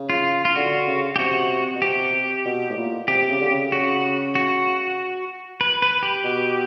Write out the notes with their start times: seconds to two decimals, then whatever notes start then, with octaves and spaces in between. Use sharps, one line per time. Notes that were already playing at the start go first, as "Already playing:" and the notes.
Already playing: C#3
0.10 F4
0.45 F4
0.56 D3 F#4
0.87 C#3
1.16 G4
1.19 C3 F#4
1.75 B2
1.82 C3 G4
2.45 B2
2.70 A2
2.77 A#2
3.08 C3 G4
3.30 C#3
3.41 D3
3.51 C#3
3.72 C#3 F#4
4.35 F#4
5.61 B4
5.82 B4
6.03 G4
6.24 B2